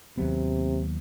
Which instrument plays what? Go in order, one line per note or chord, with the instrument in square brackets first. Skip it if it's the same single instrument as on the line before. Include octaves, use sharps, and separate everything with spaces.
[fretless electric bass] D#2 F#3 B3 [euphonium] C3